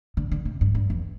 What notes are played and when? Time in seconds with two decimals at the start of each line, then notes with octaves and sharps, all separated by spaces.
0.17 D3
0.31 D3
0.45 C3
0.61 G2
0.75 G2
0.90 E2